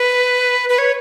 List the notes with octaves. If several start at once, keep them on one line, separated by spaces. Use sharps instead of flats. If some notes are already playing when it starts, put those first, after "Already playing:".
Already playing: B4
B4
C#5